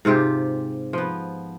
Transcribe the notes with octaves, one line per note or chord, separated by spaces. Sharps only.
G#2 C3 F4 G4
F3 B3